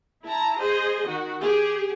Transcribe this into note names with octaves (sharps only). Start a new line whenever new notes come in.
E4 A5 A#5
G#4 C5 D#5
D#3 F#4
G4 G#4